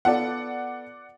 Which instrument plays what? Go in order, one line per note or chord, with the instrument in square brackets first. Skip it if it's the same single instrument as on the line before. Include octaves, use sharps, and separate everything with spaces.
[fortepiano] B3 F4 A4 [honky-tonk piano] D5 F#5